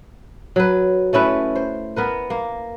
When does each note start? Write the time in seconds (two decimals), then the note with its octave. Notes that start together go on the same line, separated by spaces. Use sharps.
0.56 F#3 B4
1.13 A3 C#4 E4 B4
1.55 C5
1.96 B3 A#4 B4
2.30 A#3